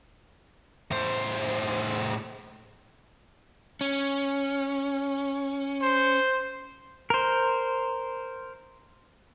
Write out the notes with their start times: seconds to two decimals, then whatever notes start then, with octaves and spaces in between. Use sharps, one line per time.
0.91 A2 C5
3.81 C#4
5.82 C5
7.10 A#4 C5